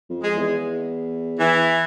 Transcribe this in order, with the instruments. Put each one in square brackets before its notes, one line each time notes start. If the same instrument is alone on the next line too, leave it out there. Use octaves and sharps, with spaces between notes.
[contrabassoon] F2
[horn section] G#3
[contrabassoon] E2
[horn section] E3